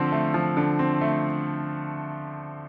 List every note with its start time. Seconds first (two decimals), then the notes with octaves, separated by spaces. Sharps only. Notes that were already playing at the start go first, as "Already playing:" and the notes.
Already playing: D3 F3 C4
0.12 A3
0.34 F3
0.57 D3
0.79 C4
1.01 A3